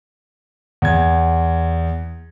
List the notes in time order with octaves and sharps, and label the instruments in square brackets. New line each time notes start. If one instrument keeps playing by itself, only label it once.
[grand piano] E2 G#6